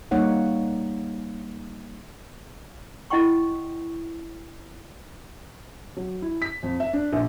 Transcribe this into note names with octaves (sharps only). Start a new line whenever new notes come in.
G3 A#3 D#4 C#5 F#5
E4 D#5 F#5 G5 C6 C#6
F#3
E4
B6
F2
E5
D4
A#1